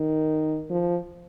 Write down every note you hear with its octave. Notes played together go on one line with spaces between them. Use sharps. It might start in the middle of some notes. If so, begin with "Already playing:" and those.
Already playing: D#3
F3